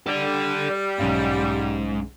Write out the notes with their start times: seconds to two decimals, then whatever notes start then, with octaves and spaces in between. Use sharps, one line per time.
0.07 G3 A4 D5
0.99 B1 G#2 C#4 F5